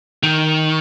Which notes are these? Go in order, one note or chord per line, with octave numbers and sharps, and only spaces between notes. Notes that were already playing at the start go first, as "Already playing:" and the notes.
D#3